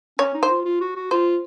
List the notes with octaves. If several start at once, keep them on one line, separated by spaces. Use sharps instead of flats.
C#4 C#5
D#4
C5
F4
F4
F#4
F#4
F4 C5